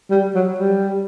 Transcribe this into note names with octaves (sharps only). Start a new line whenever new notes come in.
G3
F#3
G3